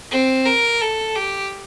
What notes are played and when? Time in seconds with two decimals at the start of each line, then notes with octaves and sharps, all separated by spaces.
0.11 C4
0.45 A#4
0.81 A4
1.15 G4